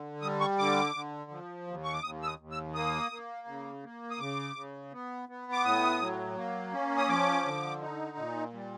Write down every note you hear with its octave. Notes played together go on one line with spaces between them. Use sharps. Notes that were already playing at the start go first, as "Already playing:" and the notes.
Already playing: D3
G3 D#6
C#6
D3 D6
D3
F3
D#2
C#6
D6
D#2 D#6
E6
D#6
D#2
E6
A#3 D#6
A#3
C#3
A#3
D#6
C#3 D6
C#3
B3
B3
D6
A2 D#6
F#3
A#3
C#4
D#6
F3 D6
D3
D#4
A#2
G3